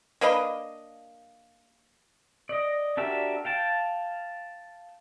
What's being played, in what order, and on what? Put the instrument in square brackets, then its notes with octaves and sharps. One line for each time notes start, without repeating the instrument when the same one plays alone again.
[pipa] A#3 D4 B4 D#5
[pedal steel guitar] D5 D#5
D4 F#4 G4 A#4 E5
F5 G5 A5